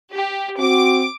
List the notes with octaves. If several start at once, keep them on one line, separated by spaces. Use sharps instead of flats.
G4
C4 F#4 D6 D7